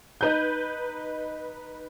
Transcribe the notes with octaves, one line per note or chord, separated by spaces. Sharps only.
D#4 B4 G6